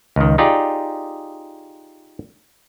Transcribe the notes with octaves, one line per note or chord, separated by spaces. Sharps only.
C#2 D#3
D#4 F4 G4 G#4 D5